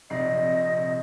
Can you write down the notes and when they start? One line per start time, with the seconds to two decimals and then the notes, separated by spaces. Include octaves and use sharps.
0.10 A#1 C3 D#5 C7